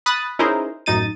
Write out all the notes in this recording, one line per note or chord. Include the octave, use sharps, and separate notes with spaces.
B5 D#6 F#6 A6
C#4 D#4 E4 G#4 A#4 C5
A1 F#2 D#4 A6 D#7